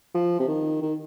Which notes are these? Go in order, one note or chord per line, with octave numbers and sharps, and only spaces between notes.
F3
C3
D#3
D#3